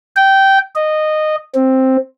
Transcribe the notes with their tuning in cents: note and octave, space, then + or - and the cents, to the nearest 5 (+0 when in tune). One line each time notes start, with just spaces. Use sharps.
G5 -15
D#5 -15
C4 +5